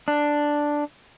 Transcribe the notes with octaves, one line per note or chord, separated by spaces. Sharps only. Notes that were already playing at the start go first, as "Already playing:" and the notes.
D4